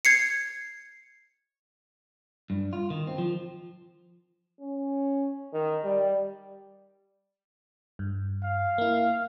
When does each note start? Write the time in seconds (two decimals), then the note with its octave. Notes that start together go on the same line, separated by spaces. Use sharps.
0.05 G#6 C7 C#7
2.50 G2
2.73 F4
2.90 D#3
3.07 C4
3.18 F3
4.60 C#4
5.53 D#3
5.84 G3
7.99 G2
8.44 F5
8.78 A#3 E4